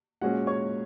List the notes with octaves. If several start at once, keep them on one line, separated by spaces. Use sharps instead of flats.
A#2 G#3 C#4 F#4 F#5
C#5 C#6